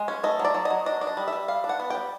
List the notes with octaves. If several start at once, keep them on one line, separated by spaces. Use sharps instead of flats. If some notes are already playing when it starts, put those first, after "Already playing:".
Already playing: G#3
C#4
A3 D#5
F#3
D5
F#3
D#5
F#3
D4 D#5
D4
D#5
G3
E5
G3
G3 F5
D4
F#5
B3
G3 G5